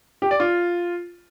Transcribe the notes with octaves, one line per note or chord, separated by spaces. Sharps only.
G4
D5
F4